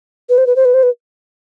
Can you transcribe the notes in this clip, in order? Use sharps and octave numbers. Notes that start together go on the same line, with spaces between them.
B4
C5
B4
C5
B4
C5
B4